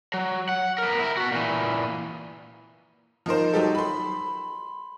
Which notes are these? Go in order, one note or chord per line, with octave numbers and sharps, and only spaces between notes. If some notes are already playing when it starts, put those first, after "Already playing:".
F#3
F#5
B3 A#4
E4 A#4
B3 F#4
A#2 E3
F3 D#4 A#4 C5
F#3 D#4 G4 A4
B5 C6